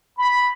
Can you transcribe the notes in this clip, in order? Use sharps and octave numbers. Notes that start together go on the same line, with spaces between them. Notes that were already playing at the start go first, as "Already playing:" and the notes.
B5